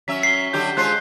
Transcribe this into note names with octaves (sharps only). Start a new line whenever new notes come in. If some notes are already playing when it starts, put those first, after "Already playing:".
F#3 C#4 E5 B6
B6 C7 G7
D3 F#3 G4 G6
G#3 F4 C5 F#6 C7